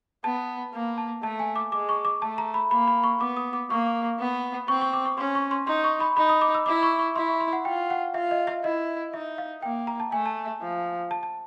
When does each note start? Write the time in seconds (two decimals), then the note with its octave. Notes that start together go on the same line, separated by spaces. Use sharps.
0.24 B3 A5
0.74 A#3
0.98 A5
1.23 A3 A5
1.39 G#5
1.56 D6
1.72 G#3 D6
1.89 C#6
2.05 D6
2.22 A3 A5
2.38 A#5
2.54 B5
2.71 A#3 B5
2.87 B5
3.04 C#6
3.20 B3 D6
3.37 D#6
3.53 D6
3.70 A#3 C#6
4.19 B3
4.68 C4 C#6
4.82 C#6
4.93 D6
5.05 C#6
5.17 C#4 C6
5.35 C#6
5.51 C6
5.67 D#4 C6
5.84 C#6
6.00 B5
6.17 D#4 B5
6.29 D#6
6.41 D6
6.55 E6
6.66 E4 D6
6.83 C#6
6.99 C#6
7.16 E4 C6
7.28 C#6
7.40 C6
7.53 F#5
7.65 F4 G5
7.90 F#5
8.14 F4 E5
8.31 D#5
8.47 E5
8.64 E4 D#5
9.13 D#4 E5
9.38 F5
9.62 A#3 G5
9.87 A#5
10.00 A5
10.12 A3 G#5
10.26 A5
10.61 F3
11.11 A5
11.23 A5